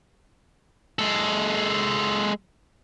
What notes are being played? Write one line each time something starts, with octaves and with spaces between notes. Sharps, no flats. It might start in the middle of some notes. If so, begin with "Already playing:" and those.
G#3 A4